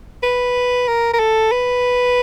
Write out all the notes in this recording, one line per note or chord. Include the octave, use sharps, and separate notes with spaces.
B4
A#4
A#4
A4
B4